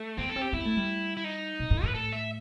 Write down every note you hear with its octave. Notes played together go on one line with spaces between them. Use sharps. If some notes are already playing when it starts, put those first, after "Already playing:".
Already playing: A3
B3 C4
A4
C4
G4
B3 E4
A3
G3
E4
D#4
B2
A2
A2 B4
A4
E5